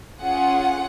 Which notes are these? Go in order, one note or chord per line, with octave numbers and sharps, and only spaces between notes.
C#4 F4 G#4 F#5